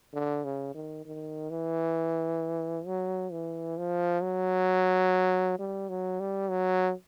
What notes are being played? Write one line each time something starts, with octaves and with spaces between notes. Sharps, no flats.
D3
C#3
D#3
D#3
E3
F#3
E3
F3
F#3
G3
F#3
G3
F#3